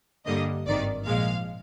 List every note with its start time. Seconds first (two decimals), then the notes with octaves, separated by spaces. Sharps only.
0.26 G2 D3 G3 A#3 D#5
0.67 G#1 G2 D#3 D5
1.07 A#1 A#2 F3 G#3 F5